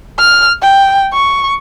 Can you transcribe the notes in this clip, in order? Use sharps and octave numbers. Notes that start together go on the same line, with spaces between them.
F6
G5
C#6